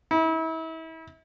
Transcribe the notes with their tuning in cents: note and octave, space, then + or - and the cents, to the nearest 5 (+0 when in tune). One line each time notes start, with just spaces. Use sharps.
E4 -35